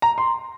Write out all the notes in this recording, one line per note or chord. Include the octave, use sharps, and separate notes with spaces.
A#5
C6